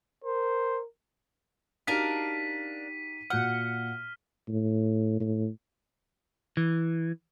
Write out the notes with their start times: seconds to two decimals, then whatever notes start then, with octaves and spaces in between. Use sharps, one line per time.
0.24 A#4 C5
1.87 D4 D#4 F#4 G4 A#4 F5 B6 D#7
3.30 A#2 F#4 F#5 F6 G6
4.49 A2
5.20 A2
6.57 E3